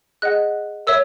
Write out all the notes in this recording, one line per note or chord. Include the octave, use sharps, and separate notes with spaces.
G#4 D#5 F#5 F#6
A#4 C#5 E5 E6